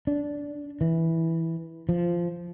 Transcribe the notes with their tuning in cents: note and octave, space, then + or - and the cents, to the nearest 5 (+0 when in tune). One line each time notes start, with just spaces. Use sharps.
D4 -10
E3 -10
F3 -10